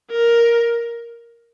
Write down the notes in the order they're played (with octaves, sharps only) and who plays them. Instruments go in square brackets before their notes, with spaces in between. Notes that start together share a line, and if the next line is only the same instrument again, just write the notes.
[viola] A#4